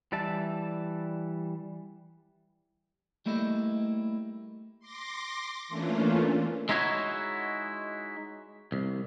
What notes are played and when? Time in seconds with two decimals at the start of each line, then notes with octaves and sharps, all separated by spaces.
0.12 E3 G3 D5 E5 A5
3.26 G3 A3 A#3 E4 A4 D#5
4.80 C6 D6 A#6
5.68 E3 A3 A#3 C#4 D4 F4
6.69 G#3 D#4 E4 F#4 C#5
8.72 C2